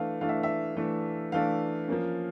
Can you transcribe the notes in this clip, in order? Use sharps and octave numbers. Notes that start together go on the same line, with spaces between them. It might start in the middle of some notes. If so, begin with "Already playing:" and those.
Already playing: E3 A3 D4 F5
E3 A3 D4 F5
E5
E5
E3 A3 D4
E3 A3 D4 F5
F3 A#3 C#4